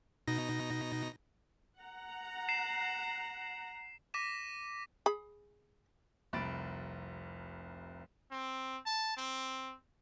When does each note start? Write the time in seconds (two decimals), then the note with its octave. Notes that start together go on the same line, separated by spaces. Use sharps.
0.27 B2 D#4 A#6
1.80 F#5 A#5
2.49 C7 E7
4.14 D6 A#6 B6 D#7 E7
5.06 G#4 B5
6.33 F1 C2 B5 A6 D7
8.31 C4
8.86 A5
9.17 C4